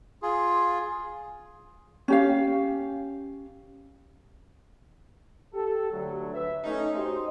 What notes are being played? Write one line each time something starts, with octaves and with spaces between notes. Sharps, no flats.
F4 G#4
C#4 G4 F5
G4 A4
D2 F#3
B4 E5
A3 C#4 D#4
F#4 G4 C5